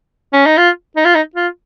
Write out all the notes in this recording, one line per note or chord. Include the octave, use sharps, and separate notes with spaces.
C#4
D#4
F4
D#4
F4
D#4
F4